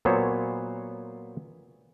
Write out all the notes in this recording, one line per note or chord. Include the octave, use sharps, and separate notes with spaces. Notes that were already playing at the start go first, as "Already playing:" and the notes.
A#2 F#3 B3 C5 C#5